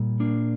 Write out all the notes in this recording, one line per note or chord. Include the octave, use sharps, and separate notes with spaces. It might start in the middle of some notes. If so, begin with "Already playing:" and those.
Already playing: A#2 G3
A#3 D4